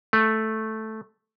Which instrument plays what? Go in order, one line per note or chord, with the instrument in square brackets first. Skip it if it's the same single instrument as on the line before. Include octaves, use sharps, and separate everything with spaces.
[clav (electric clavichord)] A3